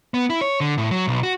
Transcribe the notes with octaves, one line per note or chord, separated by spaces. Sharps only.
B3
E4
C#5
D3
A2
F#3
B1
F#4